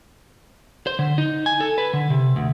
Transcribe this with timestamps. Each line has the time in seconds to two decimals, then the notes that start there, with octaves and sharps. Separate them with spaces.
0.87 C5
0.99 D3
1.18 D#4
1.46 G#5
1.60 A4
1.78 B4
1.93 D3
2.10 C3
2.36 D2